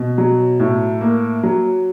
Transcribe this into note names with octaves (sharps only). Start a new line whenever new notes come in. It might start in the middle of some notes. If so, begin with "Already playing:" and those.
Already playing: B2
F#3
A2
A#3
F#3